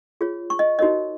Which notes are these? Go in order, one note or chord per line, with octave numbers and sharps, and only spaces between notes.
F4 G#4 C#5
C#6
D#5
D#4 F#4 A#4 C#5 D#5